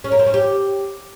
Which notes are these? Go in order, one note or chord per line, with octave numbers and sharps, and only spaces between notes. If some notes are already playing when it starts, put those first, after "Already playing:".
C#4
A#3
C4
C#4
G4